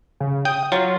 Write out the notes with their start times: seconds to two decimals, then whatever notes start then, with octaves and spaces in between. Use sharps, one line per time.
0.20 C#3
0.45 G5 D#6
0.72 F#3 F4